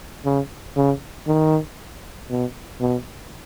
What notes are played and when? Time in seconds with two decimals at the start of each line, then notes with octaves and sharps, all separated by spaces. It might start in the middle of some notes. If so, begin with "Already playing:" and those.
0.25 C#3
0.76 C#3
1.27 D#3
2.30 B2
2.81 B2